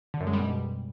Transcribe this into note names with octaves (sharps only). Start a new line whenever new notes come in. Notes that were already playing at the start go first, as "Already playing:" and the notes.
D3
F#2
G#3
G3
B2